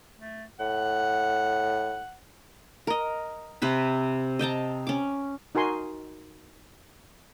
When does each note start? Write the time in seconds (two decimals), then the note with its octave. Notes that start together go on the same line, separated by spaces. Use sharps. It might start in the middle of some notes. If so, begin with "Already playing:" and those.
0.18 A3
0.60 A2 F#5
2.87 A#4 D#5
3.62 C3 B4 B5
4.39 D#5 G5 A5 A#5
4.87 C#4 D6
5.55 D#4 F#4 A#4 G#5 C6